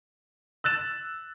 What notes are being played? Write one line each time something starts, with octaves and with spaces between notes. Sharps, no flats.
E6 F#6 A6 E7